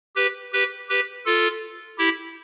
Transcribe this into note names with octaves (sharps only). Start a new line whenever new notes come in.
G4 B4
G4 B4
G4 B4
F4 A4
E4 G4